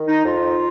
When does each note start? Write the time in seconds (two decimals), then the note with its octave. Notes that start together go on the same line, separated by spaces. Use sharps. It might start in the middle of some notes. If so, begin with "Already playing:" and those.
Already playing: D#3
0.08 D#4
0.25 F2 F4